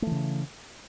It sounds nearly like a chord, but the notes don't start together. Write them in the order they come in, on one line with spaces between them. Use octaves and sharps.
A3 E3 C#3